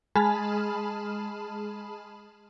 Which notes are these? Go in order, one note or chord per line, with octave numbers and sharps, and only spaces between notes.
G#3 G#4 A5 B5 F6